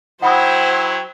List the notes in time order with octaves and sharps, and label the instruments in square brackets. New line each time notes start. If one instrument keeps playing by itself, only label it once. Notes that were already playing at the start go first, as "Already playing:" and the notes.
[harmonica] F#3 E4 [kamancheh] C5 G5 [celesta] F#5 B5 D#6